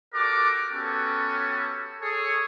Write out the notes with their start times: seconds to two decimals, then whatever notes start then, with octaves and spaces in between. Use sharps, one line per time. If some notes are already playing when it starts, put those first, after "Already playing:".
0.14 F#4 G4 A4 A#4 D5 D6
0.71 B3 C#4 F#4 G4 A4
2.01 G#4 A4 C#5